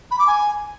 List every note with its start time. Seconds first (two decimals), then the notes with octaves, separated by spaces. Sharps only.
0.11 B5
0.19 D6
0.27 G#5